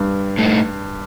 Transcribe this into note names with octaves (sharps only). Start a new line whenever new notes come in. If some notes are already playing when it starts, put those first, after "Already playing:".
Already playing: G2
A2 A3 D#4